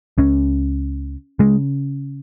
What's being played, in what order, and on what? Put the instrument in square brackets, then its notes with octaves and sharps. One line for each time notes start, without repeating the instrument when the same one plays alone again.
[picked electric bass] C#2 C#3 C#4
C#3 G#3